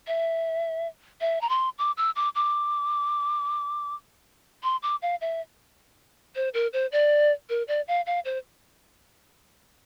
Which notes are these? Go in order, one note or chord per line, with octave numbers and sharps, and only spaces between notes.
E5
E5
A#5
C6
D6
E6
D6
D6
C6
D6
F5
E5
C5
A#4
C5
D5
A#4
D5
F5
F5
C5